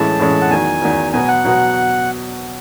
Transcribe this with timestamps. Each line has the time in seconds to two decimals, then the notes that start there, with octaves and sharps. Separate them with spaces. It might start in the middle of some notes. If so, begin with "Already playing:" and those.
Already playing: A2 E3 G#3 C#4 E4 A5
0.19 A2 E3 G#3 C#4 E4
0.41 F#5
0.50 E2 D#3 F#3 G#5
0.82 E2 D#3 F#3
1.13 B2 F#3 B3 F#4 G#5
1.28 F#5
1.45 B2 F#3 B3 F#4